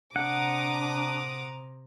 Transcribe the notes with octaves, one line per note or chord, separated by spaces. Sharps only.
C3 D4 F#5 A#5 D6 D#6